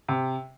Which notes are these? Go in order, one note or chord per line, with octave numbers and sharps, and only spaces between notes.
C3